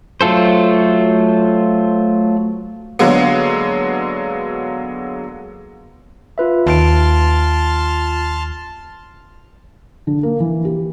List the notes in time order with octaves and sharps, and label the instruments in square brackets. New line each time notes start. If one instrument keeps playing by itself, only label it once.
[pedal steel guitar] F#3 A3 F4 A4 C5
[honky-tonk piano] D3 F#3 G#3 A#3 B3
[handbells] F4 B4 E5
[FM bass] D#2 [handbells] F4 D7 [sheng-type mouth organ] A5 C6 F6
[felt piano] D3
A#3
E3
G4